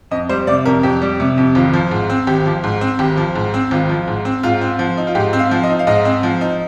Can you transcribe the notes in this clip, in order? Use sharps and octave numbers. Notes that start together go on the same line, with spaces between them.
F2 D#5
G3 C5
C3 D5
F2 A#4
F2 G4
G3
C3
F2
G#1 F4
F3
G#2
C4
G#1 G4
F3
G#2
C4
G#1 G4
F3
G#2
C4
G#1 F4
F3
G#2
C4
G#2 F4
C4
F3
D#4
F4
G#2 G4
C4
F5
F3
D#5
D#4
F5
G#2 D#5
C4
F3
D#4